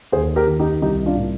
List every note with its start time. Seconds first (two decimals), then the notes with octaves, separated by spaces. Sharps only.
0.12 D#2 G#4 C5
0.36 G4 A#4
0.47 D#3
0.60 D#4 G4
0.82 C2 D#4 G4
1.06 D4 F4
1.17 A#2